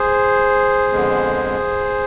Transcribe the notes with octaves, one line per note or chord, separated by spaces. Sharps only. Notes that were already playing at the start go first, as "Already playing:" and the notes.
Already playing: G#4 C5
F2 D3 G#3 B3